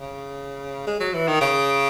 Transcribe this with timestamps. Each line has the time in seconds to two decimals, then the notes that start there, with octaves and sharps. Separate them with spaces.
0.01 C#3
0.87 G#3
1.00 F#3
1.14 E3
1.27 D#3
1.41 C#3